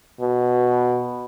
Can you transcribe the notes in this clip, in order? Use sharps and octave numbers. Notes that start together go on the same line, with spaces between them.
B2